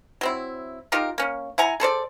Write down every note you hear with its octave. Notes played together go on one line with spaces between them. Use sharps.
F#3 C4 E4
D#4 F4 G4 A#4
A#3 C#4
E4 F#5 G#5 A#5
G#4 A4 C5 D5